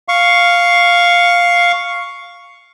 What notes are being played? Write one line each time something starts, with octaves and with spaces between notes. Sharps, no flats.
F5 C#6